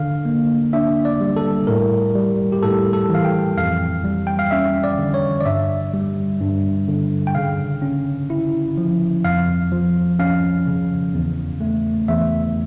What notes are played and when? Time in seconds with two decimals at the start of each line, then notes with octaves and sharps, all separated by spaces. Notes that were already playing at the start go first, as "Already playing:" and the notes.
Already playing: D3 F5
0.25 A#3
0.73 D4 E5
1.05 D5
1.21 G3
1.36 A4
1.67 A2 A#4
2.15 G3
2.52 G4
2.62 A2 A4
2.93 A4
3.09 E3
3.15 F5
3.25 G5
3.57 F2 F5
4.04 G3
4.27 G5
4.39 F5
4.51 C#4 E5
4.84 D5
4.98 D3
5.14 C#5
5.40 D5
5.46 G2 E5
5.94 G3
6.40 G2
6.88 D3
7.27 G5
7.35 C#3 F5
7.82 C#4
8.30 E4
8.78 F3
9.24 F2 F5
9.72 F3
10.19 C#4 F5
10.67 C#3
11.14 E2
11.61 A3
12.08 E2 E5